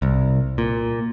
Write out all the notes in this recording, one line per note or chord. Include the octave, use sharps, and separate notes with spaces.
C2
A#2